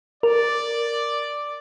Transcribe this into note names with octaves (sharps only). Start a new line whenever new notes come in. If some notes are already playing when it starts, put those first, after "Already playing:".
A#4 D5